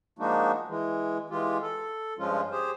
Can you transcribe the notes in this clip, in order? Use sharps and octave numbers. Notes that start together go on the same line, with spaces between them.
F3 G#3 A#3 D4 D#4 F#4
E3 G#3
E3 G#3 F4 G4
A4
G2 F3 G#3 C#4 F4
G4 G#4 C5